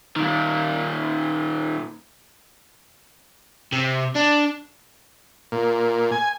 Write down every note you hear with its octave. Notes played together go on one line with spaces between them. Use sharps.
A#2 D#3
C3
D4
A#2
G#5